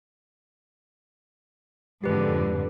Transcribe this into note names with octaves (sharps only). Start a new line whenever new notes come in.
F2 G#2 D3 G4 B4